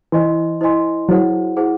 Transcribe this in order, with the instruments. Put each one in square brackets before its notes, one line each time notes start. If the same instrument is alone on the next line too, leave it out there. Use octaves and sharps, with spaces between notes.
[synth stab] E3 [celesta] E4 C5 D#5 G#5 C6
[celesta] E4 C5 D#5 G#5 C6
[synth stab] F#3 [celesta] E4 G#4 C5 F#5
[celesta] E4 G#4 C5 F#5